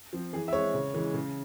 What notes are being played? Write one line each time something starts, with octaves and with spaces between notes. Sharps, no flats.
F3 C4
E3 G#4
E5
G#3 C4 C#5
C#3
E3 G#3
C#3